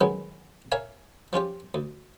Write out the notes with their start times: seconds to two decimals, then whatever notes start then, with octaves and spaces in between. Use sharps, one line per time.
0.01 D#3 F#3 G#3 B3 C#4
0.72 A#4 C#5 E5 F5 G#5
1.33 F3 C#4 F4 G4
1.74 D2